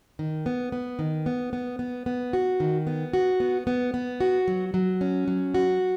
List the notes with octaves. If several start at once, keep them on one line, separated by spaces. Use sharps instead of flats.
D#3
B3
B3
D#3
B3
B3
B3
B3
F#4
D#3
B3
F#4
B3
B3
B3
F#4
F#3
F#3
C#4
F#3
F#4